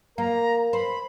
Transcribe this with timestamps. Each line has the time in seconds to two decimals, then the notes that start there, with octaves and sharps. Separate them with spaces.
0.18 A#3 A#4 A#5
0.73 C5 B5